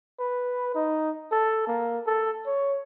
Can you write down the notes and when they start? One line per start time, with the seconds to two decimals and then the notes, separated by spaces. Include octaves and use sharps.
0.19 B4
0.75 D#4
1.32 A4
1.67 A#3
2.07 A4
2.46 C#5